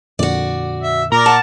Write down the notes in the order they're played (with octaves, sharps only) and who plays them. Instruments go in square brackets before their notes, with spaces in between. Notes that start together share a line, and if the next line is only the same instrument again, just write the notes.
[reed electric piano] F2 A#2 D3 [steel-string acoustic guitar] F#4 D5
[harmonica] E5
[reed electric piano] A#2 [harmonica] A#4 D5 [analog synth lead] A#5
[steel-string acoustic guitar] F#5 [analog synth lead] A5